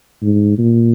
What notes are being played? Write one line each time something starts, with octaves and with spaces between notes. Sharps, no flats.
G#2
A#2